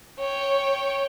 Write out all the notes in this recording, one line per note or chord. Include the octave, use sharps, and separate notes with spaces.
C#5 G5